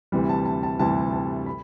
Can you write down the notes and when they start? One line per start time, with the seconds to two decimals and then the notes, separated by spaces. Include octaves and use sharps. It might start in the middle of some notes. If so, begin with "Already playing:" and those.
0.12 D2 C3 E3 G3
0.29 A5
0.45 A5
0.63 A5
0.79 D2 C3 E3 G3 A5
1.13 A5
1.46 B5